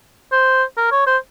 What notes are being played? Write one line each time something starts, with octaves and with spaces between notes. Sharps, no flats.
C5
A#4
C#5
C5